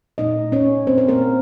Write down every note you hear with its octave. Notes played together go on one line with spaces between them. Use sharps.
A#2 A3 D#4 D#5
C#4 C#5
C4 C5
C5
A#3 A#4